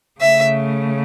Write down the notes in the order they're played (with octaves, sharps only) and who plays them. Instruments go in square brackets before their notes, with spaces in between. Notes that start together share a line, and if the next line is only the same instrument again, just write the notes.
[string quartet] C#3 A3 E5